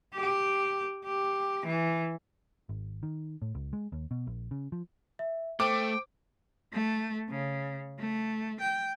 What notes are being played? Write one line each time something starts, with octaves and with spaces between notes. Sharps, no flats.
G4
G4
E3
G#1
D#3
A2
C#2
G#3
D#2
B2
A#1
C#3
F3
E5
A3 C5 G5 D6
A3
C#3
A3
G5